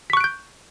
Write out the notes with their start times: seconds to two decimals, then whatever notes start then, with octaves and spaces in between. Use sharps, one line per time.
0.10 B6
0.13 C#6
0.17 F#6
0.20 D7
0.24 G6